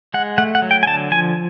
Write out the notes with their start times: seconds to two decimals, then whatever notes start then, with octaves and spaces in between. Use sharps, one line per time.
0.14 G#3 F#5
0.38 A3 F#5
0.55 F#5
0.62 F#3
0.71 G5
0.83 G#5
0.87 D3 A5
1.11 F3 G#5